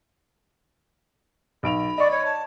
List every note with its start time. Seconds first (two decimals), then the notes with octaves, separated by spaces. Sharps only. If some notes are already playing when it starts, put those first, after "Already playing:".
1.63 B1 B5 D7 F7
1.98 D5 D#5 C#6
2.10 C#5
2.25 A5